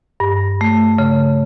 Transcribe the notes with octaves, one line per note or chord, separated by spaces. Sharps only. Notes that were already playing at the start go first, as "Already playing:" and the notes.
G2
A3
C#3